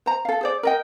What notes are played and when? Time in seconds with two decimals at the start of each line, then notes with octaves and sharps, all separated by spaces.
0.06 C5 A#5
0.25 A4 F5
0.41 G#4 C5 D5
0.63 A#4 D#5 G5